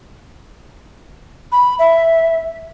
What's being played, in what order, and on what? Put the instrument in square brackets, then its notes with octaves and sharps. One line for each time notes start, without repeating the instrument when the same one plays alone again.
[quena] B5
E5